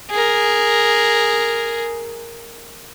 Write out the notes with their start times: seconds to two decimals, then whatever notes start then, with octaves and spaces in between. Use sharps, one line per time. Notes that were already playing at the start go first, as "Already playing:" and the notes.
0.11 G#4 A#4